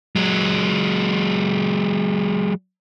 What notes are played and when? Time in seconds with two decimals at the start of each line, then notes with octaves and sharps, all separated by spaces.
0.16 F#3 G#3